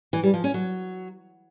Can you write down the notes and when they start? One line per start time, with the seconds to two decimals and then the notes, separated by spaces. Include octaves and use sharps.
0.13 E3
0.23 G3
0.34 F3
0.44 C#4
0.54 F#3